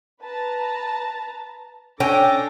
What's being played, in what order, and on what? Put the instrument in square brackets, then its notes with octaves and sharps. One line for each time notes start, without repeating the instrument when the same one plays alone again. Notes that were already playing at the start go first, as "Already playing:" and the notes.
[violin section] B4 A5 A#5
[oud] C#4 [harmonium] D4 A4 [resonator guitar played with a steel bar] G5 [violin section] D6 A#6